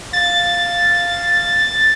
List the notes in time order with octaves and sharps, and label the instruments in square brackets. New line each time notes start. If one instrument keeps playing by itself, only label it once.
[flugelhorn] F5 [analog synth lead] A6